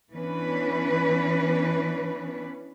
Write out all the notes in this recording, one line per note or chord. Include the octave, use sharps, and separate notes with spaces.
E3 B3 C#4 D4 B4